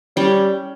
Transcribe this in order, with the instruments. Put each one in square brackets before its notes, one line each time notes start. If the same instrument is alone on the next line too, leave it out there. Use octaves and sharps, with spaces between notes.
[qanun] G3 [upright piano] C#4